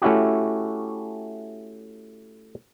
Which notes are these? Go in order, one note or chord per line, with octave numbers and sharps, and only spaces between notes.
A3 C#4 E4 F#4 G4